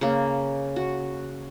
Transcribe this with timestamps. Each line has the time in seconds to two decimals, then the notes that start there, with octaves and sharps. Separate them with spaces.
0.01 C#3 A#3
0.76 F#4